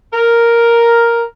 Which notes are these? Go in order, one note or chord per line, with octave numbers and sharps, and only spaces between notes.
A#4